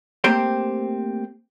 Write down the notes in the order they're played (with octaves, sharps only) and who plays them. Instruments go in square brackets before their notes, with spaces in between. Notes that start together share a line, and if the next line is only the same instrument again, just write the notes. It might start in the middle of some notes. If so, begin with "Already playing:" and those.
[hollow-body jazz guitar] A3 A#3 C4 G4 C5 G5